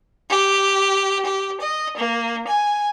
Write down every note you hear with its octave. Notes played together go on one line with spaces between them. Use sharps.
G4
G4
D#5
A#3
G#5